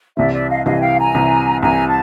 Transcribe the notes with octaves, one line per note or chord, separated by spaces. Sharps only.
C2 C3 E3 D5 E5
D5 E5
D#5 F5
C2 C3 E3 D#5 F5
G#5
F5 G5
G#5 A#5
C2 C3 E3
C2 C3 E3 G#5 A#5
A5